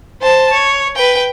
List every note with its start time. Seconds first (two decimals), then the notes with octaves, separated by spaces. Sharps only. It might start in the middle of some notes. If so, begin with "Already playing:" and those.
0.21 C5 A5
0.52 C#5
0.95 B4 G5